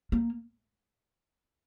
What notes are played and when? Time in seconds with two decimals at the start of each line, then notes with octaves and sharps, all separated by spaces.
0.12 A#3